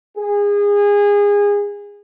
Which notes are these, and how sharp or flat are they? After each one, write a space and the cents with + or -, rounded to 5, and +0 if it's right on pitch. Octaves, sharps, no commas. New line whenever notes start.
G#4 -25